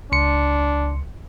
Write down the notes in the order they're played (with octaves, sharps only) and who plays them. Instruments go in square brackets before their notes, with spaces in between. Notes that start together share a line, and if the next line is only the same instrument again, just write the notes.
[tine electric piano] C#2 C6 C#7 [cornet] D4